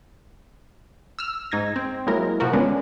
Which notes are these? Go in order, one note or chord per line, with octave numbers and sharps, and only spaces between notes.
E6 F6
G#2 D#4 G#6 A#6
C4
F#3 G#3 A#3 E4 A#4
C3 F3 F#4 A#4
D3 G#3 B3 C#4 D4